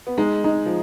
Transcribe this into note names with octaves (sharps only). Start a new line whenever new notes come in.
B3
G#3 D#4
G#3 D#4
F3